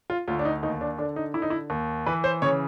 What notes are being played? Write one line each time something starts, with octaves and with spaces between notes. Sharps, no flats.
F4
D2 F4
D4
D#4
D#2 D#4
D4
D3 D4
D#4
D3 E4
D#4
E4
D#2
E3 B4
C5
C#3 C#5